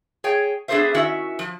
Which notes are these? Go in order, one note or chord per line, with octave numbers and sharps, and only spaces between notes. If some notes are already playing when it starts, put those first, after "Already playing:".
G#4 C#5 G5
B3 D4 G#4 A4 C5 E5
D#3 C#4 E4 F#4 E5
F3